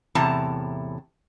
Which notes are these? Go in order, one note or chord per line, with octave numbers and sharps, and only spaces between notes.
E2 A2 C3 A5 A#5